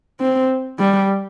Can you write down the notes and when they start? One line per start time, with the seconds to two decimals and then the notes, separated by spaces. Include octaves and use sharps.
0.20 C4
0.79 G3